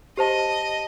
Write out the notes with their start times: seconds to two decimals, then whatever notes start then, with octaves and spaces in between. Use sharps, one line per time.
0.17 G4 C5 D#5 A5